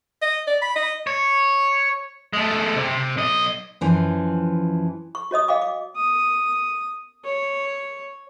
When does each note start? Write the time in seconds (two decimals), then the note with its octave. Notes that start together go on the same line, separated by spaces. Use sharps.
0.22 D#5
0.47 D5
0.62 B5
0.76 D#5
1.07 C#5
2.33 G#3 A3
2.76 C3
3.17 B1 D#5
3.81 F#2 E3 F3
5.15 C#6
5.31 F#4 C#5 D#5 D#6
5.48 D#5 F5 G5 D6
5.62 D6
5.97 D#6
7.25 C#5